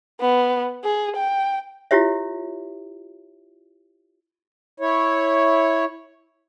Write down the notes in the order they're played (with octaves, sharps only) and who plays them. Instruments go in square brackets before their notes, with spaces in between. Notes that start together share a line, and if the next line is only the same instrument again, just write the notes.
[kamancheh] B3
G#4
G5
[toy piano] E4 F4 G4 C#5 E5
[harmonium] E4 C#5